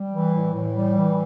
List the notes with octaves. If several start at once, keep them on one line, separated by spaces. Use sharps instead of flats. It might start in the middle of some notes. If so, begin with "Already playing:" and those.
Already playing: G3
E3
A2
A2
G3
E3